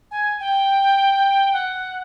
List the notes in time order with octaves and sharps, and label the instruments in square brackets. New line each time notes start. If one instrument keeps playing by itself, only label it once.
[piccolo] G#5
G5
F#5